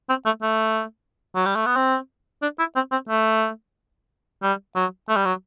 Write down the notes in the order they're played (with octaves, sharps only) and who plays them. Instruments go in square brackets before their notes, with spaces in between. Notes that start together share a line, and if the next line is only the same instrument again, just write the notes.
[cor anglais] C4
A3
A3
F#3
G3
A3
B3
C4
D4
E4
C4
C4
A3
G3
F#3
A3
G3
F#3